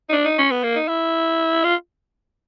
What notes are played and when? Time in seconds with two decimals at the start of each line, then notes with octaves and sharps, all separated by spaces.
0.09 D#4
0.12 D4
0.25 D#4
0.38 C#4
0.51 B3
0.63 A#3
0.76 D#4
0.88 E4
1.64 F4